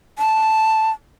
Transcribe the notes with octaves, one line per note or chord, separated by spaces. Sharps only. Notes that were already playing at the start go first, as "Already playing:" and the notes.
A5